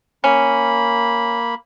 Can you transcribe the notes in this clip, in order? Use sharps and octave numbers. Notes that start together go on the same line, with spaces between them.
A#3 C#4 B5